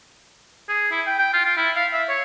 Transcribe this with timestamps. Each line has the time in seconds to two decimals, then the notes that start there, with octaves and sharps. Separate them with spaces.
0.69 G#4
0.91 E4
1.07 G5
1.19 G5
1.33 F4
1.44 F4
1.57 E4
1.76 F5
1.93 E5
2.09 C#5